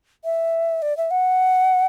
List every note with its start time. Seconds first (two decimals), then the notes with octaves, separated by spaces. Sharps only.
0.25 E5
0.82 D5
0.97 E5
1.11 F#5